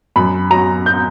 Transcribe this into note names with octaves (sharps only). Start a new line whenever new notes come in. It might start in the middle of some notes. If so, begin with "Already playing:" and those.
F#2 B5
F#3 A#5
G6